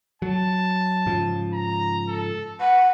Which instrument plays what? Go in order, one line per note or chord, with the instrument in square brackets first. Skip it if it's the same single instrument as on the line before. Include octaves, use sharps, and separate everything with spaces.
[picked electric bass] F#3 [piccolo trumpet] A5
[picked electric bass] G#2 C#3 F3
[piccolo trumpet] A#5
A4
[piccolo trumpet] B4 [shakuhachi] F#5